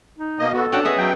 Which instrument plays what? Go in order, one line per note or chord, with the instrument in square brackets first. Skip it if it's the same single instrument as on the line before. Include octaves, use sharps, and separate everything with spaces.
[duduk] D#4
[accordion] B2 A#3 D#5
[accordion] B3 F#4 [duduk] A4
[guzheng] C#4 F#5 A5 [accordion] D4 [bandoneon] F#4 G5
[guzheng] B3 F#4 D#5 [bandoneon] G#4 E5
[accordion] F#3 G5